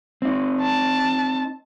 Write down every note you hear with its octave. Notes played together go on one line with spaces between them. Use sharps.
C4 D#4
A5